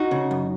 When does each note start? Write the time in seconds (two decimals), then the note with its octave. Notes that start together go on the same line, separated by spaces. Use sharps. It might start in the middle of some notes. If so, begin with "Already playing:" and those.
Already playing: D#4 F#4
0.11 C#3
0.31 F#2